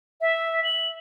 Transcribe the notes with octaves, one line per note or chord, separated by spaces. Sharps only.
E5
F#7